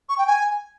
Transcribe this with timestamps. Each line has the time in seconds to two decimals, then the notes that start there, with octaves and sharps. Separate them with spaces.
0.09 C#6
0.18 G5
0.27 G#5